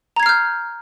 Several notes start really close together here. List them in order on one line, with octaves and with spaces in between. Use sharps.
A#5 G#6 C7 F6 G6